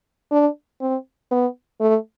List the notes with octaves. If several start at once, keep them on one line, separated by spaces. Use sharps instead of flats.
D4
C4
B3
A3